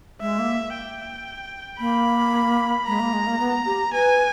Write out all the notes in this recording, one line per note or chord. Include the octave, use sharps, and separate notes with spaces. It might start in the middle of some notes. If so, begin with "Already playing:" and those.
G#3 E5
A#3
G5
A#3 B5
G#3 A#5
A#3
G#3
A#3
B3
G4
B4 G#5